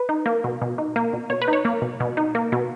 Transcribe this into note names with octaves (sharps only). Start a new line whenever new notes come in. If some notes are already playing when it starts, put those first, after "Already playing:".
Already playing: B4
D#4
A#3
B2
B2
D#4
A#3
B2
B2 C#5
B4
D#4
C#5
A#3
B2
B2
D#4
A#3
B2